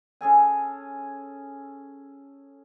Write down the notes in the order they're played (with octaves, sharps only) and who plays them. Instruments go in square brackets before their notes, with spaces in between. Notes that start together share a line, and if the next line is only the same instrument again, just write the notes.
[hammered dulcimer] C#4 G#4 A4 G#5